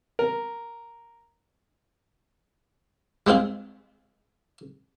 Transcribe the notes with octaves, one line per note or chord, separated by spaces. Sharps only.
A#4
G3 G#3 C4 F4 G#4